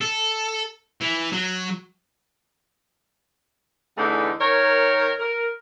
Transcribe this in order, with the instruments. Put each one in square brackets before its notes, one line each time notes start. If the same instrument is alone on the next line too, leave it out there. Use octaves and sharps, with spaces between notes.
[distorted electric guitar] A4
E3
F#3
[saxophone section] E2 D3 E3 A3 D#4
D#3 A#4 C#5
A#4